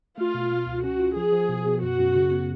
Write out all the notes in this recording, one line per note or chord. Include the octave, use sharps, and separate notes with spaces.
A3 F4
B2
B2
C#2
C#4 F#4
F4
F3 G#4
F3
B2
B2
F#2 F#4
F#2
C#3
B3